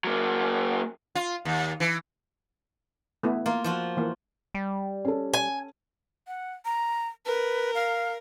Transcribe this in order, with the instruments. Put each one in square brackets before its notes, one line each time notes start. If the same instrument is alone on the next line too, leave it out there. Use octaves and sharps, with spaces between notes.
[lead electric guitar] F#3 A#3
[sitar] F4
D#2
E3
[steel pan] A3 B3 E4
[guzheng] A#3 F4
F3 F4 F#4
[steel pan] E3 A#3
[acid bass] G3
[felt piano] C#4 A4
[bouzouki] G#5
[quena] F#5
A#5
[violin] A#4 [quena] B4
[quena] F5